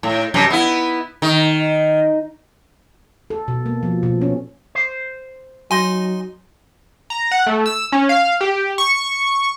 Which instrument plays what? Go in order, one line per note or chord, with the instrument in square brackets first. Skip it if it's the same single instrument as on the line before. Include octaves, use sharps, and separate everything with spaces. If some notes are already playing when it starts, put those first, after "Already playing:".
[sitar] A2
F#2 C3
B3 E4
D#3
[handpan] A4
B2
A#3
F3
B2
C#4
[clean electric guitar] C5
[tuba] F#3 [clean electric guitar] D#4 [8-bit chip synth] G#5 C6
[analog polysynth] A#5
F#5
A3
E6
C#4
F5
G4
C#6